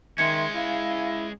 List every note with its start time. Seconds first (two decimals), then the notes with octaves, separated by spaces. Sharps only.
0.18 D#3 G#3 C#4 E5 C6 G#6 C#7
0.55 E4 F5